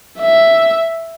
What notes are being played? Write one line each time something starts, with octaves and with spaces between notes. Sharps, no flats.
E5